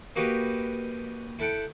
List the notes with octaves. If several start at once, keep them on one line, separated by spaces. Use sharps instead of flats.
A#3 D#4 F#4 G4 B4
E4 A4 F#5 G5